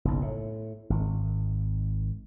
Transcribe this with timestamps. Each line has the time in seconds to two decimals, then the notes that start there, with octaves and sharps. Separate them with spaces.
0.05 F#1 B1
0.22 A2
0.90 G#1